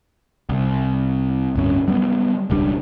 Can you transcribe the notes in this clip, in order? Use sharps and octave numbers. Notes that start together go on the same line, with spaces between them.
C2
D1 G2 C#4
F#3 G3 B3
E1 C#2 G3 D4